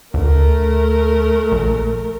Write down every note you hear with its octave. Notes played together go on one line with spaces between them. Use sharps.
D2 A3 A#4
A#1